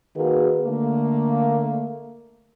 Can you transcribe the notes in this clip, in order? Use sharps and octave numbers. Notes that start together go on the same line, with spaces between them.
D#3 A#3 F#4 G#4 B4
D3 A3 A#3